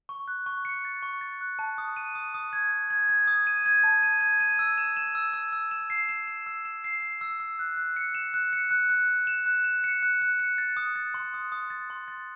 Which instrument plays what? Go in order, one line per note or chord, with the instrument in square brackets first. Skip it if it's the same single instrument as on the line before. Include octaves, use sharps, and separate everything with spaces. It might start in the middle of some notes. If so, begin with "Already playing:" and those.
[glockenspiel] C#6
F#6
C#6
C#7
A6
C#6
A6
F#6
A5
D#6
D#7
D#6
D#6
G#6
G#6
G#6
G#6
D#6
D#7
G#6
A5
D#7
G#6
D#7
E6
E7
E7
E6
E6
E6
E7
C7
E7
E7
E6
E7
C7
C7
E6
E6
F#6
F#6
C#7
E7
F#6
C#7
F#6
F#6
F#6
E7
F#6
E7
C#7
F#6
F#6
C#7
A6
D#6
A6
C6
D#6
D#6
A6
C6
A6